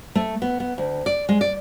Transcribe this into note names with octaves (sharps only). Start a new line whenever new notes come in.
A3
B3
B3
D2
D5
G#3
D5